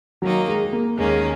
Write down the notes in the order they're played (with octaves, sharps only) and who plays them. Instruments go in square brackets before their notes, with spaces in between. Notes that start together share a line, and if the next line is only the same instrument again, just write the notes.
[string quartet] D#3 A#3 D#4 [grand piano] F#3
[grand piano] G#3
G#3
A#3
[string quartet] D#2 D#3 A#3 C#4 [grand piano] G#3